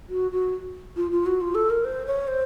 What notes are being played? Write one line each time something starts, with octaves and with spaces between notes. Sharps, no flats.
F#4
F#4
F4
F4
F#4
F4
A4
A#4
C5
C#5
C5